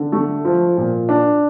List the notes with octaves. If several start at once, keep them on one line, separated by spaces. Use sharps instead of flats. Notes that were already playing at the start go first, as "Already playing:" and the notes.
Already playing: D3
A3
F3
A#2
D4